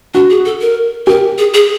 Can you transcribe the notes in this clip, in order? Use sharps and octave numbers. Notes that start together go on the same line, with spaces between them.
D4 F#4
G#4
A4
A#4
G4 A#4
G#4
G#4